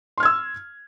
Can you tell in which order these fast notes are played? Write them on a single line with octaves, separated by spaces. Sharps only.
C6 F6 G#6 E6